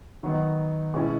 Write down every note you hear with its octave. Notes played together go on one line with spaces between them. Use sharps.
D#3 F#3 B3 D#4
B2 G#3 C#4 E4